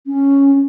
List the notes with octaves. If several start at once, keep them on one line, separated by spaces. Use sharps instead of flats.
C#4